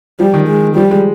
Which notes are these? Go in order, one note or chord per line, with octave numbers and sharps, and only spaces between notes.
F3 G3
D#3
G#3
F3 G3
G#3